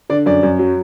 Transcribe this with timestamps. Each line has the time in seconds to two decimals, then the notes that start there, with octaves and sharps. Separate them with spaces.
0.10 D3 D5
0.26 F#2 D5
0.43 F#2
0.59 F#3